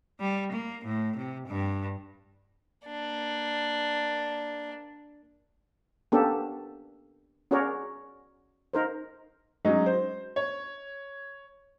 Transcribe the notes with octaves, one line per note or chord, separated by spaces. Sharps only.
G3
A#3
A2
C3
G2
A#3 D4
A#3 B3 C#4 D4 G4 A4
C#4 F#4 G#4 A#4 C#5 D5
D#4 A#4 C5
F#3 G#3 C#4 D#4
C5
C#5